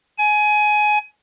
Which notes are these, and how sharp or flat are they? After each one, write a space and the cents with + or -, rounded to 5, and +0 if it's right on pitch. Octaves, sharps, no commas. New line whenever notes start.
G#5 +20